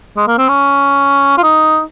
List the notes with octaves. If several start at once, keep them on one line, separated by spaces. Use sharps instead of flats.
G#3
A#3
C4
C#4
F4
D#4